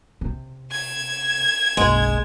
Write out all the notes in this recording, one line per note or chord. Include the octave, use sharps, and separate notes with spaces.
C3
G#6 E7
F#1 B1 G#3